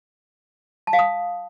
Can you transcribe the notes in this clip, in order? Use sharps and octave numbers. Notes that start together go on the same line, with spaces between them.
A5
F5
D#6